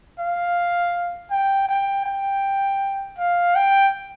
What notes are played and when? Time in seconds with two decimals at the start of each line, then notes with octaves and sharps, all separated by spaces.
0.19 F5
1.31 G5
1.69 G5
2.06 G5
3.18 F5
3.55 G5